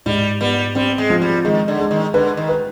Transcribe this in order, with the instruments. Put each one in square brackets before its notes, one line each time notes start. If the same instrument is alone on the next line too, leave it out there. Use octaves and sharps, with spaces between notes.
[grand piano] G#2 [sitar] G3
[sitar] G3 [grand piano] B3
[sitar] G3 [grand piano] C4
[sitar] G#3
[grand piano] F3
[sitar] G3
[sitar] D#3 [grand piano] G#3
[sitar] D3
[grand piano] G#3
[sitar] D#3
[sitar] D3 [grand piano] B4
[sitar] D#3
[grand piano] B4